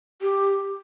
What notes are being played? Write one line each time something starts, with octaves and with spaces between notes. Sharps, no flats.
G4